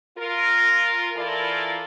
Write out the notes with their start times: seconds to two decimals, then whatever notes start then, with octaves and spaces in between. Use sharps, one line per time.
0.18 F4 A#4
1.17 E3 E4 F4 A4 A#4 D5